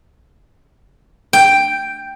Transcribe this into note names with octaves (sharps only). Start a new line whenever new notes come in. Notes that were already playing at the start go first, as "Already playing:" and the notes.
G5